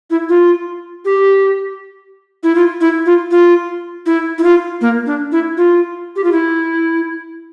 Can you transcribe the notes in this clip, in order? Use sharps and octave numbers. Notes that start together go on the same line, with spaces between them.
E4
F4
G4
E4
F4
E4
F4
F4
E4
E4
F4
A#3
D4
E4
F4
G4
F4
E4